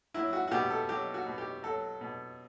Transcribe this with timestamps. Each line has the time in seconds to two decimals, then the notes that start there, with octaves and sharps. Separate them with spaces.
0.14 F#3 E4
0.33 F#4
0.48 F#4
0.51 B2 G4
0.70 A4
0.89 F#3 G4
1.14 F#4
1.26 B2
1.38 G4
1.63 F#3 A4
2.01 B2